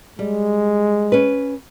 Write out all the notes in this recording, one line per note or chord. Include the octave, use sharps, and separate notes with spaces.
G3 G#3
C#4 B4